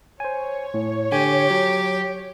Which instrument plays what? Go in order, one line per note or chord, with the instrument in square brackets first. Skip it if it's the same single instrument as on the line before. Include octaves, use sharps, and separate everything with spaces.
[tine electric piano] C5 G#5 [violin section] C#5
[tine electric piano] A2
[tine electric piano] D3 G#5 [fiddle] G4
[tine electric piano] F#3